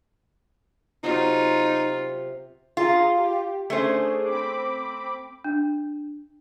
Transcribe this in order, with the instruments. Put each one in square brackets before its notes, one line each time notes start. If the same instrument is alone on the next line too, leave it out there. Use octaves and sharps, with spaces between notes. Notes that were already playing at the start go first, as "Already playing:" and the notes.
[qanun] C3 F#3 [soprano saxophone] D#4 [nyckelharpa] F4
[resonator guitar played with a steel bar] F4 [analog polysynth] G#4 F5 A#5
[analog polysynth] G4
[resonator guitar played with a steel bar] A3 C#4 C5 [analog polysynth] D4 G#4
[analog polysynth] C4 B5 D6
[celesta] D4